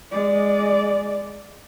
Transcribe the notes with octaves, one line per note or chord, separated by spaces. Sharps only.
G#3 D5